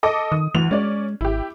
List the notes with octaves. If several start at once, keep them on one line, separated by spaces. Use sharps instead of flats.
A4 D#5 D6
D#3 D#6
D2 E3 F7
G#3 C#4 D5
G#1 E4 G4